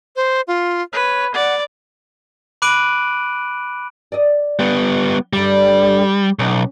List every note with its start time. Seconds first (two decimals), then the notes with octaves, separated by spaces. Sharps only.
0.16 C5
0.48 F4
0.93 B4 C#5
1.34 D5 F#5
2.62 B5 D6 F#6 D7 D#7 F#7
4.12 D5 D#5
4.59 G3 B3
5.33 D2 G2 D3 G3
6.39 B1 C#4